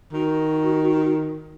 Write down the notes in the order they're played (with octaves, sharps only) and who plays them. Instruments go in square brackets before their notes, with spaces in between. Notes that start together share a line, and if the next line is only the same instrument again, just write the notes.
[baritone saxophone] D#3 [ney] F#4